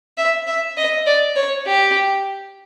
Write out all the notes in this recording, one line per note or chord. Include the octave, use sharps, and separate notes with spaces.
E5
E5
D#5
D5
C#5
G4